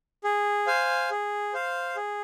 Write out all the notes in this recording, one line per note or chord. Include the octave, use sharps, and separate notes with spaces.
G#4
C5 F5 G#5
G#4
C5 F5
G#4